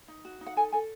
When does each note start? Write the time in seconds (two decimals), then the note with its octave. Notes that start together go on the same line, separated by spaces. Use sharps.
0.08 D#4
0.25 F#4
0.41 D#4
0.46 F#5
0.56 A4 G#5
0.72 A4 G#5